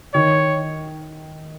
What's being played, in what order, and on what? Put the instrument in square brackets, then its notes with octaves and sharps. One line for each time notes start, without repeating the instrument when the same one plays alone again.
[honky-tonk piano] D#3 [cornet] C#5